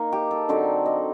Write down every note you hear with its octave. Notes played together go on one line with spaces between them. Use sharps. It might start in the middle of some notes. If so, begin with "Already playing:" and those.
Already playing: A#3 D#4
G4
A4
D3 F#3 C4 D#4 D5
D#5